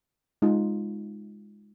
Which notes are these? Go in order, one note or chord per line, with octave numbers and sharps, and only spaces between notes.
G#3 D#4 F4